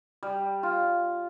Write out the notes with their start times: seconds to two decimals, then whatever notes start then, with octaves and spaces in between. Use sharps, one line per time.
0.23 G3
0.63 F4